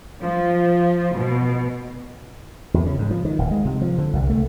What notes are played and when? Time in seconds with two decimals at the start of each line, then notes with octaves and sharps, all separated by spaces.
0.23 F3
1.16 B2
2.74 E2
2.86 C#3
2.99 G#2
3.11 F3
3.25 D#3
3.39 D1
3.51 G#3
3.65 C3
3.82 F3
3.98 D3
4.13 C2
4.29 A3